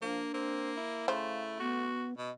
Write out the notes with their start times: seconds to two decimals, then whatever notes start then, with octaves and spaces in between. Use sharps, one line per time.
0.02 F3 A#3 D4
0.34 A#3 C4
0.77 E4
1.08 C#3 A3 C5 F5
1.60 B3 F#4
2.17 B2 D#5